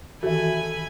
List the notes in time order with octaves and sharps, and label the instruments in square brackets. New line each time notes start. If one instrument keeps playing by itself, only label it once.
[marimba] D#3 E3 [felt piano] F#4 E5 [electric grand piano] A4 [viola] G#5 B5